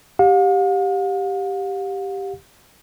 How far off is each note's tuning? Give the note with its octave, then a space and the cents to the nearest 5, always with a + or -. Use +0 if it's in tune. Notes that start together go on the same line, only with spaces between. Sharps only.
G4 +0 F5 +45